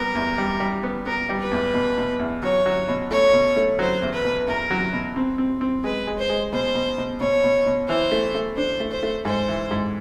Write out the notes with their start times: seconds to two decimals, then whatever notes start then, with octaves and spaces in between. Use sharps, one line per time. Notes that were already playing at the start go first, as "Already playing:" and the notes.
Already playing: G3 B3 A#4
0.15 E2
0.38 G3
0.60 G3
0.83 B3
1.06 B3 A#4
1.29 G3
1.40 B4
1.52 E2
1.74 B2
1.98 B2
2.19 E2
2.43 F#3 C#5
2.66 F#3
2.88 B2
3.11 A3 C#5
3.33 B2
3.56 A3
3.79 F#3 C5
4.02 E2
4.13 B4
4.25 B2
4.47 E2 A#4
4.71 F#3
4.93 B2
5.16 C4
5.38 C4
5.61 C4
5.84 G#3 B4
6.07 G#3
6.18 C5
6.29 G#3
6.52 B2 C5
6.75 B2
6.98 B2
7.21 B2 C#5
7.44 B2
7.66 B2
7.89 E3 C5
8.12 A3
8.35 A3
8.57 D4 C5
8.80 A3
8.91 C5
9.03 A3
9.25 G#2 C5
9.48 E3
9.71 G#2